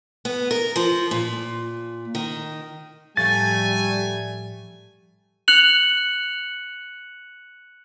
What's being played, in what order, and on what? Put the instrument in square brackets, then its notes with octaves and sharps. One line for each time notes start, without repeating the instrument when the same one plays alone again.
[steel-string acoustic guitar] B3
A#4
F3
A#2
D#3
[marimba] A2 F3 [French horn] G3 [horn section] A3 G#5 [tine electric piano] A6
[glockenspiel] F#6 C#7 F7 F#7